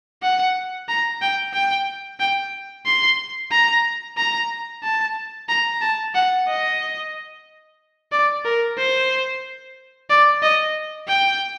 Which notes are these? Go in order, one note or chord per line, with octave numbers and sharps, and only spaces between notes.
F#5
A#5
G5
G5
G5
C6
A#5
A#5
A5
A#5
A5
F#5
D#5
D5
A#4
C5
D5
D#5
G5